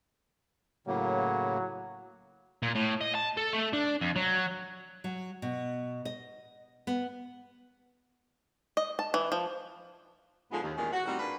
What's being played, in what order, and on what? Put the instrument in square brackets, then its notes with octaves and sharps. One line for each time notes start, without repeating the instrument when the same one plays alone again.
[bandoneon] A2 C#3 A#3 [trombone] F#3
[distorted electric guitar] A#2
A2
D#5
A5
A4
A3
D4
F2
F#3
[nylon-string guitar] F#3
B2
D#5
B3
[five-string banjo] D#5
A5
E3
F3
[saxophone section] G#2 D3 F3 G#3 B3
D#2
E2 A#2 D#3 G#3 C#4
F#4
A2 G3 C4 D#4 F#4
G#2 A#3 D4 B4 F5